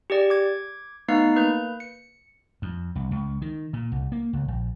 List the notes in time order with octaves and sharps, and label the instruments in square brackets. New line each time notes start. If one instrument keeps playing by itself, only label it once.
[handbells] G4 G#4 D5
D6 G#6
A3 B3 D#4 B4 F5 C7
A#3 B4 G6
C#7
[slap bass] F2
C2
C#2
D#3
A#2
C2
A#3
C#2
A#1